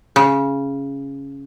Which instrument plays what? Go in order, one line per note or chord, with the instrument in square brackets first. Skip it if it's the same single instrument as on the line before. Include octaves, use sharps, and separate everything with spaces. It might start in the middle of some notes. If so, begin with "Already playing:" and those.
[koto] C#3